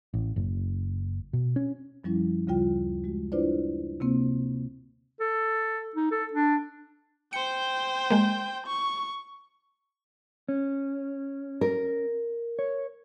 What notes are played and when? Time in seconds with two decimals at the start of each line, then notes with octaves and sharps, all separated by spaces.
0.14 A1
0.36 F#1
1.33 B2
1.56 C#4
2.04 F#2 F3 G3 C#4 E4
2.47 D2 C#3 G3 F4 G5
3.04 G#3 F#4
3.32 D4 E4 F4 B4 C5 D5
4.00 C3 A#3 C4
5.20 A4
5.96 D#4
6.11 A4
6.33 D4
7.33 C5 G5 C#7
8.10 G#3 A#3
8.67 C#6
10.49 C#4
11.61 A#4
12.59 C#5